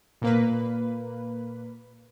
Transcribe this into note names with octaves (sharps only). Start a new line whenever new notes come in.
A#2 A#3 B4